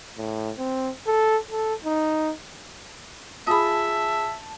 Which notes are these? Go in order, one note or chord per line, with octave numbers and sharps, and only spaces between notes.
A2
C4
A4
A4
D#4
F4 G#4 E5 A5 B5 D#6